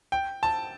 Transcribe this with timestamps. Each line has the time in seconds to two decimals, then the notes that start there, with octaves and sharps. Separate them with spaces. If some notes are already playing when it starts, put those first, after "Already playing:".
0.12 G5
0.43 A5